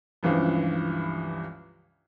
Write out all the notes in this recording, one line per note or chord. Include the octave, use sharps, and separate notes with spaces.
C#2 G2 E3 F3